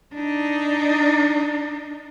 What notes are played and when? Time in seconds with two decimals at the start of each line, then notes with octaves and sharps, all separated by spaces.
0.14 D4 D#4